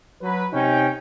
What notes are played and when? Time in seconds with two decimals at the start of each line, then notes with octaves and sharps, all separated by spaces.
0.22 F#3 B4
0.53 C3 C#4 D#4 G5